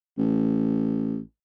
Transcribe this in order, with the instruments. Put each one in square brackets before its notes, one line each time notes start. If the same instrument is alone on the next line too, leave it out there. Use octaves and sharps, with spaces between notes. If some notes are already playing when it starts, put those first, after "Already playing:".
[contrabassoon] A1